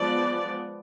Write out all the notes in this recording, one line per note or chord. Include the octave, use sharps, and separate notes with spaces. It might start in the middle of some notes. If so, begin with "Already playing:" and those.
Already playing: F3 G#3 B3 D5